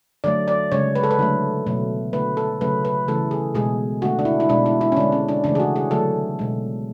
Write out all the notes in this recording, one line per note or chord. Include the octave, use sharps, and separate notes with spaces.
D3 F#3 A3 D5
D5
C#3 G#3 C#5
B4
A4
B4
D3 F#3 A3
B2 F#3 A3
D3 A3 B4
A4
C#3 F#3 A3 B4
B4
C#3 E3 A3 A4
G#4
B2 G#3 G#4
D3 A3 F#4
D4
E4
E4
B2 G#3 D4
E4
E4
C#4
D3 G#3 D4
C#4
D4
C#3 E3 A3 D4
G#4
F#4
G#4
D3 F#3 A3 A4
B2 G#3